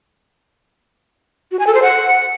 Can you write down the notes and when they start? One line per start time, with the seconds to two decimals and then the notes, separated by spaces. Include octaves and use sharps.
1.52 F#4
1.59 G#5
1.67 A4
1.75 C5
1.82 F#5